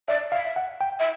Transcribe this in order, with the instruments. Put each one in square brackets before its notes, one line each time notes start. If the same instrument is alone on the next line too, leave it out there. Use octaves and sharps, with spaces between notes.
[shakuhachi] D5 [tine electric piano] E5
[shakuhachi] E5 [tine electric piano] F5
[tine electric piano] F#5
G5
[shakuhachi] E5